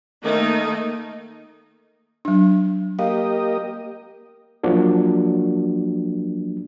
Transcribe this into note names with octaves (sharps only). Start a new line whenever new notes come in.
D#3 A3 A#3 D#4
F#3 D4
A#3 G4 D#5 F5
F3 F#3 A#3 D4 F#4